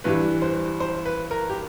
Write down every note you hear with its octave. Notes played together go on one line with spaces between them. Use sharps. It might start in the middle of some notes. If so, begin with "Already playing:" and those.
G2 E3 G3 B4
C5
C5
B4
A#4
G4